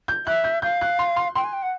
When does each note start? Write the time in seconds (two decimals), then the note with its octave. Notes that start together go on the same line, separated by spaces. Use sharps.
0.08 G6
0.26 E5 F#6
0.44 G6
0.62 F5 G6
0.81 F#6
0.99 C6
1.16 C6
1.35 G5 C6
1.44 G#5
1.53 G5
1.62 F#5